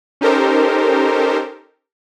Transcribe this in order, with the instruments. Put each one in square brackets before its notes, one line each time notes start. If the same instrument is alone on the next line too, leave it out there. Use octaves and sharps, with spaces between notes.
[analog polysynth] C#4 D#4 G4 A4 A#4 C5